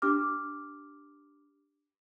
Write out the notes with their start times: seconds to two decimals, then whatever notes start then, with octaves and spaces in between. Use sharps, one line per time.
0.02 D4 G4 D6 F6